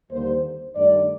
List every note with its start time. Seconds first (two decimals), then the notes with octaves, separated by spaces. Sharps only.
0.10 D#2 D3 G3 A#3 C5
0.76 G2 D#3 A3 D5